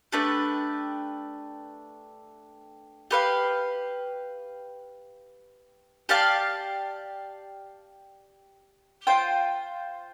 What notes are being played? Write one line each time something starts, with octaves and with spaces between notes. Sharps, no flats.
A3 D4 G4 B4
G4 B4 F5
G4 D5 F5 A5
F4 C5 G5